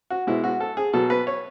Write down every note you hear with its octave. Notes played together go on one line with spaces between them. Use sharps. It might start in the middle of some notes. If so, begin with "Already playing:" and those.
F#4
B2 G#3 E4
F#4
A4
G#4
B2 F#3 A4
B4
C#5